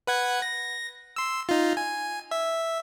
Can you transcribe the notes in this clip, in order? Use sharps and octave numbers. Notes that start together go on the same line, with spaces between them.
B4 F#5 G#6
A#6
C6 E6
D#4 F4
G#5
E5